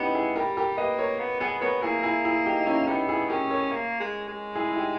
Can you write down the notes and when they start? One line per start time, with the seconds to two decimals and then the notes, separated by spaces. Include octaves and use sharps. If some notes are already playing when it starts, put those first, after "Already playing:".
Already playing: B3 C#4 D#4 E4 G4
0.15 E4 G#4
0.36 G3 G4 A#4
0.57 G4 A#4
0.77 A#3 B4 D#5
0.98 A#4 C#5
1.19 B3
1.40 B3 G#4 B4
1.61 B3 A#4 C#5
1.82 A#3 E4 G#4
1.99 A#4
2.03 E4 G#4
2.25 E4 G#4
2.46 D#4 G4
2.61 D#4
2.66 C#4 E4
2.87 B3 D#4 G4
3.09 E4 G#4
3.30 C#4 G4 A#4
3.50 A#4 C#5
3.72 A#3
4.00 G#3
4.28 G#3
4.55 E4 G#4
4.68 E4
4.77 D#4 G4